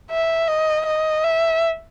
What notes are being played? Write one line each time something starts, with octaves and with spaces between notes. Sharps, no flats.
E5
D#5
D#5
E5